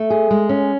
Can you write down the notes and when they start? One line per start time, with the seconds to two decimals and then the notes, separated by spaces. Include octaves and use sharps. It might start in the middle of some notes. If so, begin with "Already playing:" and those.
Already playing: A3
0.10 G#4
0.31 G#3
0.49 C#4